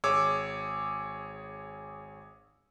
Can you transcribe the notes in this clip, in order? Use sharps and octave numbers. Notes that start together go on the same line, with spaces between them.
G#1 G#4 C#5 D6 E6